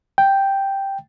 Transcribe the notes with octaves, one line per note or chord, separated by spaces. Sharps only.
G5